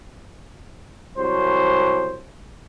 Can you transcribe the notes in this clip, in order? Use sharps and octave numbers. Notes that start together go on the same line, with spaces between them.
C2 F#3 C5